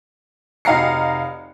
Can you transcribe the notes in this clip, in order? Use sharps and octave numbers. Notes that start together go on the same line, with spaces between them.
F1 D#4 F5 A#5 C7 C#7